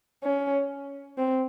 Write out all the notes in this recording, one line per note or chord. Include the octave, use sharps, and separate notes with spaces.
C#4
C4